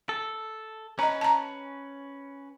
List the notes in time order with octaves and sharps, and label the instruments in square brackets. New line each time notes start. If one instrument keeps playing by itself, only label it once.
[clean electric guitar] A4
[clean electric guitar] C#4 B4 [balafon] D#5 A#5
[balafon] A5 A#5